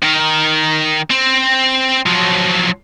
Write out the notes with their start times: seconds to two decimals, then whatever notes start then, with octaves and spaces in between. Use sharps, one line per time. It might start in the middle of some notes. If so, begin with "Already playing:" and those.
0.03 D#3 A#4
1.10 C4
2.06 F3 F#3